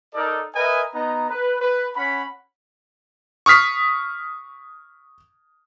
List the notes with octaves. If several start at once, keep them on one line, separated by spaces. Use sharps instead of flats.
D#4 A4 A#4 D5
A#4 B4 D#5 E5 G#5
B3 D#4 A#5
B4
B4
C#4 F#5 B5
C#6 D#6 F6 B6 C7